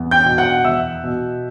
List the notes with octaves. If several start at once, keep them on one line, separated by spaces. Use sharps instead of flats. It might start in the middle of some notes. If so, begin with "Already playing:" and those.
Already playing: E2
G5 G6
B2
F#5 F#6
E2 E5 E6
B2